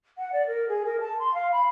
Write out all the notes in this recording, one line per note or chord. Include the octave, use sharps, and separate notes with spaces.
F#5
D5
A#4
G#4
A#4
A5
C6
F5
B5